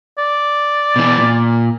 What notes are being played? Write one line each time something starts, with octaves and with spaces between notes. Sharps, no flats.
D5
B2 E3
A#2